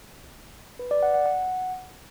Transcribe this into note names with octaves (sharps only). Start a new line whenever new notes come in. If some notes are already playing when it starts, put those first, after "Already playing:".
B4
D5
F#5
F#5
F#5